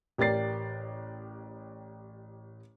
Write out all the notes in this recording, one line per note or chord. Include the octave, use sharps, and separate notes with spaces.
A1 G4 A#4 D5 A6 C7